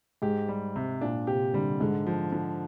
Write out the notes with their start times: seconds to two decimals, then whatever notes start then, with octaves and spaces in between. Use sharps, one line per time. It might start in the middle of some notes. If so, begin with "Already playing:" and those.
0.22 G#2 G4
0.49 G3
0.76 C3
1.01 A#2 D4
1.27 C3 G4
1.53 D3 G3
1.80 G#2 D3
2.07 F3
2.32 D3